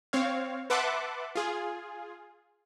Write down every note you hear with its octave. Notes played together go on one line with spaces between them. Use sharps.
C4 C#5 F5
B4 E5 F#5 A5 C6 D6
F4 G#4